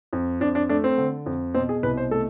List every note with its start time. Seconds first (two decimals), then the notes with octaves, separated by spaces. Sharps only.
0.13 F2
0.41 F2 D4
0.55 D4
0.69 A3 D4
0.84 C4
0.98 D3
1.26 F2
1.54 B2 C4
1.69 G#4
1.83 C2 B4
1.97 C5
2.11 A3 A4